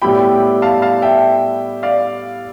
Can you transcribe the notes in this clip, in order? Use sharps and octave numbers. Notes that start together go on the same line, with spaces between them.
A2 G3 B3 E4 G4 G5 B5
F5 A5
F5 A5
E5 G5
D5 F5